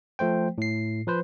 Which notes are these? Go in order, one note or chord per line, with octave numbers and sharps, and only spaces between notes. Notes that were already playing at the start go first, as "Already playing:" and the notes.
F3 A3 C5 G5
A2 C7
F3 B4 C5